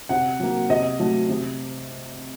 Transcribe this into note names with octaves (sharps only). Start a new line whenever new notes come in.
C3 F#5
F#3 A#3
C3 D#5
F#3 A3
C3